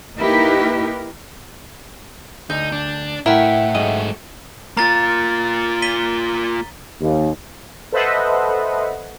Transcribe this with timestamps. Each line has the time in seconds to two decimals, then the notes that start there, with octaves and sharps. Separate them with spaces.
0.18 A#3 D#4 E4 G4 A#4 B4
2.50 D2 D#4 G6
2.72 D4
3.26 A2 E4 A#4 E5 F#5 G5
3.75 G#2 F#3 A3 D#5
4.77 A#3 F4 A#5 A6
5.82 B6 D#7 G7
7.01 D#2
7.92 A4 B4 C5 D#5 E5 F#5